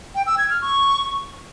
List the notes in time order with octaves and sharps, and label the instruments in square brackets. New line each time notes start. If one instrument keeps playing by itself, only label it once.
[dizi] G5
E6
G#6
F6
C#6